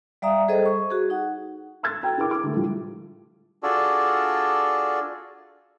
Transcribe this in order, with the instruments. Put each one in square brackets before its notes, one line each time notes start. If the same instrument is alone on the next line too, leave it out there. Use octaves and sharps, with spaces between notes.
[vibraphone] G3 D5 E5 F5 A#5 D#6
G3 G#4 A4 C5 D#5
C#6
F#4 G#4
D#4 F#5
[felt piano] C6 E6 F#6 G#6 A6
F#4 A4 G5 A#5
D4 E4 G#4 A#4 G5 D6
D6
D3 A3
A2 F3 G3 A3
[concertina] D4 F4 F#4 G#4 A4 D5